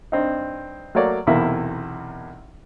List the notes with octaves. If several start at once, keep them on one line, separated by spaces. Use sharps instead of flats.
G2 C4 D#4
F#3 A3 A#3 C#5 D5
B1 E2 C3 A#3 E4 E5